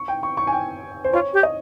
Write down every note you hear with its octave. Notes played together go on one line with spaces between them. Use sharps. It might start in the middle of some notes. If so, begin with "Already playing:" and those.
Already playing: C#6
G5
C#6
C#6
G#5
G5
C5
F4 C#5
G4
D#5